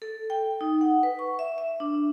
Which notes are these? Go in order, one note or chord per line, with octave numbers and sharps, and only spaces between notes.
A4
G5
D#4
F#5
B4
C#6
E5
E5
D4